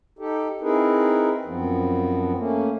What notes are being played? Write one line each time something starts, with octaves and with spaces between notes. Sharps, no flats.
D#4 G4 A4
C4 D#4 E4 G#4 A#4 B4
F#2 F3 B3 C4
A3 A#3 C#4